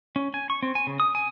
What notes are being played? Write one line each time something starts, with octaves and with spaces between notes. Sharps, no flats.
C#4
G#5
C#6
C4
G#5
C#3
D#6
G#5